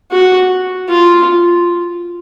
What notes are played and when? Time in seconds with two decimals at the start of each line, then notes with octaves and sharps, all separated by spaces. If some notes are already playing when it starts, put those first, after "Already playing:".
0.12 F#4
0.89 F4